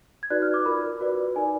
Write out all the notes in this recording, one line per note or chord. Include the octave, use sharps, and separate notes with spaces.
G#6
D#4 F#4 B4 D5 F#6
F6
D6
F4 A#4 D5 B5
F#4 B4 D5
D#4 A#4 D5 G#5